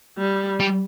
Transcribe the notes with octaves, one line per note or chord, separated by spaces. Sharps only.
G3
G3